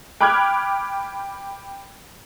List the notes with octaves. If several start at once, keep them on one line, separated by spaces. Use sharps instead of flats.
G5 B5 D6 F6 F#6 G#6